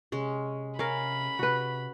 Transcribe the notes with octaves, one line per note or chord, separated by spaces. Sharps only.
C3 G#3 C#4
C#4 A#4 F5 B5
C3 F#4 B4